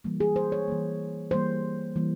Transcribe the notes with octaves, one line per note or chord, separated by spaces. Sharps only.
E3 G3 A#3
G#4
C5
C#5
E3 G3 A#3
E3 G3 A#3 C5
E3 G3 A#3